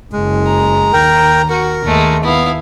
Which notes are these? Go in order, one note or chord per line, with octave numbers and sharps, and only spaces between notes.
F#1 G#3
A#5
D#2 A#4 G5
F#4 A#4
D#2 G#3 A3
B3 E4 F5